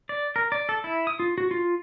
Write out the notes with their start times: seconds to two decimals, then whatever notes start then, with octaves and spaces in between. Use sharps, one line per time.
0.09 D5
0.36 A#4
0.52 D5
0.69 A4
0.84 E4
1.07 D#6
1.20 F4
1.38 F#4
1.51 F4